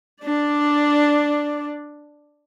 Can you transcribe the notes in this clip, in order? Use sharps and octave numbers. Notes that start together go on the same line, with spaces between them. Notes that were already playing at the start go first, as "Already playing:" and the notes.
D4 D5